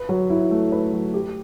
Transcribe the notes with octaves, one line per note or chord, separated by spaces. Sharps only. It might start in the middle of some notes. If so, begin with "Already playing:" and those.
Already playing: B4
F#3
E4
A3
B4
F#3
G4